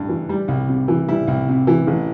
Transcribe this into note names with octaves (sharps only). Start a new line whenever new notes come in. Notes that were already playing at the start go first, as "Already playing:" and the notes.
Already playing: A1 G2
E3
G3
C2
C3
E3
G3 E4
C2
C3
E3
A1